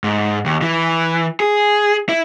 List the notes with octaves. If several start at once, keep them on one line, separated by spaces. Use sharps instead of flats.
G#2
D#2
E3
G#4
E4